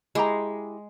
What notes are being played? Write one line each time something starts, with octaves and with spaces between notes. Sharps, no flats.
G#3 E4 G4 A#5